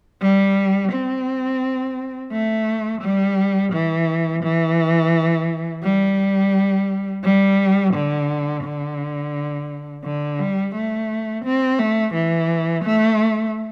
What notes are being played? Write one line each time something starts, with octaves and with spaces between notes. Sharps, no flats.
G3
C4
A3
G3
E3
E3
G3
G3
D3
D3
D3
G3
A3
C4
A3
E3
A3